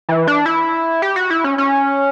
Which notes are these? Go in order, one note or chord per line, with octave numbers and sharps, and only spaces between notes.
E3
D4
E4
G4
F#4
E4
C#4
C#4